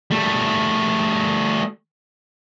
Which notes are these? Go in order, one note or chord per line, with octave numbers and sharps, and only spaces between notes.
G3 A3